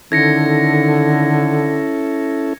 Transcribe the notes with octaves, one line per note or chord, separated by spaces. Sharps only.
D3 D#3 C#4 E4 A4 G#6 A#6 C#7